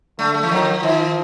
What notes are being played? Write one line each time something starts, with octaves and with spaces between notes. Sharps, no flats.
D3 A3
A3
E3
D#3 F3
D#3 F3